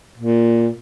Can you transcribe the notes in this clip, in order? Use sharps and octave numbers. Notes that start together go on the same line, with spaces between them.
A#2